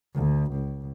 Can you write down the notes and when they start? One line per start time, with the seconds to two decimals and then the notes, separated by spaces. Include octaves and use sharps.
0.15 D2
0.52 C#2